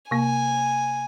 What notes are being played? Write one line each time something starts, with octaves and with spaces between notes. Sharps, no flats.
C3 A#3 G#5